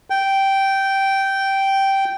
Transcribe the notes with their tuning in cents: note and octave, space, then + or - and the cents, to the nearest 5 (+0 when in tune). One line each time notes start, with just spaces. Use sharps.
G5 -10